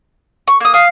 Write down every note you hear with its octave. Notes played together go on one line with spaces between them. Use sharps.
C#6
A#3 D#6
F5 D#6